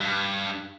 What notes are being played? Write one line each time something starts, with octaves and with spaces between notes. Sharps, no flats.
G2